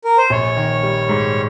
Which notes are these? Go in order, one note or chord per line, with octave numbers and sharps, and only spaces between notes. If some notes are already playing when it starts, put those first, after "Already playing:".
A#4
C5
A#1 C#5
D#3
G3
G#2